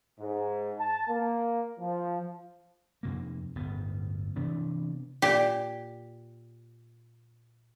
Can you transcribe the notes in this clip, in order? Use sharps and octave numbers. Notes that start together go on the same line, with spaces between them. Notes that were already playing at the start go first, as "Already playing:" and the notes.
G#2
A5
A#3
F3
F2 C3 A#3
D1 G1 B3
C3 E3 B3 D4
A#2 G4